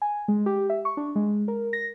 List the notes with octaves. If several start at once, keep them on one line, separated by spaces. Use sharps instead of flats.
G#5
G#3
G4
E5
C#6
D4
G#3
A#4
A#6